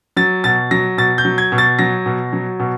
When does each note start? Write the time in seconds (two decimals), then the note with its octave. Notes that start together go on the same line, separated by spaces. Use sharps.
0.16 F#3 A6
0.44 B2 A6
0.71 F#3 A#6
0.98 B2 A6
1.18 G6
1.25 F#3
1.38 G#6
1.52 B2
1.58 A6
1.79 F#3 A#6
2.06 B2
2.33 F#3
2.59 B2